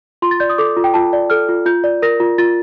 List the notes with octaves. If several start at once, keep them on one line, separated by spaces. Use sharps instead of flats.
F4 C6
A6
D5 G6
D#6
A4 D6
F4
G5
F4 A5
D5
A4 F6
F4
F4 G6
D5
A#4 A#6
F4
F4 A6